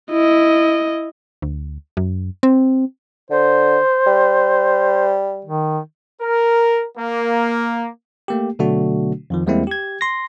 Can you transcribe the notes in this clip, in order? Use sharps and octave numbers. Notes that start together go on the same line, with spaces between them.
E4 D#5
D2
F#2
C4
D3 C5
G3
D#3
A#4
A#3
A3 A#3 G4
B2 D3 F#3 A3 D4 F#4
F2 D#3 F3
E2 G3 G#3 A#3 C4 E4
G4 G#6
C6 A#6